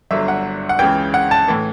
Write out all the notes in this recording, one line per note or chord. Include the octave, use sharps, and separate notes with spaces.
G1 G2 D3 F#3 E5
F#5
F#5
C#2 C#3 E3 G5
F#5
A5
A2 E3